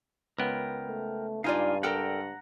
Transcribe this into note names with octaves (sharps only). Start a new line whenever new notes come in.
C#2 B3 A#4 G5
A3
G2 D#4 F4 D5 F5 G#5
A4 A#4 F#5 G5 A#5